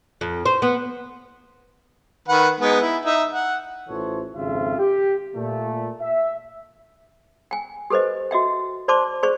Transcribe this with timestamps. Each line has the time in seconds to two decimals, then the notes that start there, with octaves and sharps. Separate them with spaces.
0.21 F2
0.45 C5
0.62 B3
2.29 D#3 B4 F#5
2.60 G#3 B3 D#4
2.80 E4
3.06 D#4 E5
3.33 F#5
3.89 A1 E3 F4 A4 C5 C#5
4.34 G#1 F2 C#3 F4 E5
4.78 G4
5.35 A#2 A3
6.00 E5
7.51 G5 G#5
7.90 G4 A4 B4 C5 D#5
8.31 F#4 D#5 E5 G5
8.88 C5 D5 A5 C6 D6
9.23 G#4 C5 D5 C#6